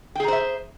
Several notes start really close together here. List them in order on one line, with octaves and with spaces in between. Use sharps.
G5 G#4 A#5 C5 E5